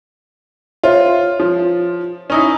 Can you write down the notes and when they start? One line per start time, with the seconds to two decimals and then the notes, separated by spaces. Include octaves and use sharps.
0.83 F4 C5 C#5 E5
1.40 F3
2.30 C#4 D#4 E4